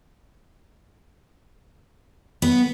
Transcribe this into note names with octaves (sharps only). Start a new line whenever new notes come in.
B3